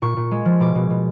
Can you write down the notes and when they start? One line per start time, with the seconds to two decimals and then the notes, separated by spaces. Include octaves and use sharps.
0.02 A#2 C#6
0.17 A#2
0.31 G#3
0.45 F3
0.60 B2 D6
0.75 B2
0.90 B2